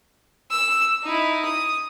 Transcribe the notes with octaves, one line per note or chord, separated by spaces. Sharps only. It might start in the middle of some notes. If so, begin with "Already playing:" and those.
E6
D#4 E4
D#6